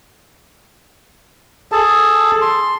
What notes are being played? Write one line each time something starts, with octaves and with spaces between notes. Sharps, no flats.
G#4 A4 A5
C6